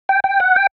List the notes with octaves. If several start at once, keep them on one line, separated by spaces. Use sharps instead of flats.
G5
G5
F#5
G5